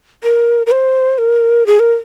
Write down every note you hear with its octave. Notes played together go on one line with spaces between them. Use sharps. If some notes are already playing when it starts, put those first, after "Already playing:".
A#4
A#4
C5
A#4
G#4
A#4